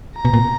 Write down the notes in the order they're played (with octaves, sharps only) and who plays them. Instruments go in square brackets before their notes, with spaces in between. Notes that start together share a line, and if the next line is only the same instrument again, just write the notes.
[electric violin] A#5
[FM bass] B2
A#2